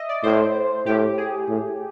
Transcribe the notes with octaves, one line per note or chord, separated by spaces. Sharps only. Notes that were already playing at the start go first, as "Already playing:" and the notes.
Already playing: D#5 E5
D5
A2 C5
A2 G4
G#4
A2